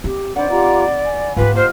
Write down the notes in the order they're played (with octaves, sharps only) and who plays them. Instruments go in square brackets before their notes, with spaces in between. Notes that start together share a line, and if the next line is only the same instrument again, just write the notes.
[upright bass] C4 [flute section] G4
[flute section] D4 C5 [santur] D#4 B4 F#5 [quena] D5
[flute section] F4 G4 A#5
G#5
[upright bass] G#2 A#3 [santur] F4 G4 [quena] B4
[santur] F4 D#5 [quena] C5 [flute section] F6